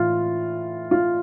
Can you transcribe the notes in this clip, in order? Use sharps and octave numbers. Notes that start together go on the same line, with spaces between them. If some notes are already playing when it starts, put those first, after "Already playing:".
Already playing: A2 E3 F4
F4